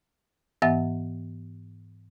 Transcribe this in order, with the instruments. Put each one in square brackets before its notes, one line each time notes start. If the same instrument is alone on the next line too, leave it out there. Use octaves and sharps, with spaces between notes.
[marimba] G#2 E3 B3 E5 F#5 A6